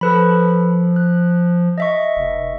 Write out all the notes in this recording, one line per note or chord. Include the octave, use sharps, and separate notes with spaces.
F3 A4 B4 B5
F#6
D#5 E5 C#6
F1